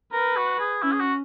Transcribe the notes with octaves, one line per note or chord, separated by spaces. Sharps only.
A#4 B4
F#4
G#4
C#4 E4
G#4
F#4